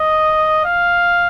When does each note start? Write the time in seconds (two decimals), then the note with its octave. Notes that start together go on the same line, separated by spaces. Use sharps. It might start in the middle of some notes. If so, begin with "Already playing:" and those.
Already playing: D#5
0.65 F5